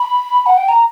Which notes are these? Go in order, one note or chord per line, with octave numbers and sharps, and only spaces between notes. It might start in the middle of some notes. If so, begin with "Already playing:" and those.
Already playing: B5
F#5
G5
A#5